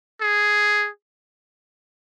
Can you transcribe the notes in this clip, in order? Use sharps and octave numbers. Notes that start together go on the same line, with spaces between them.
G#4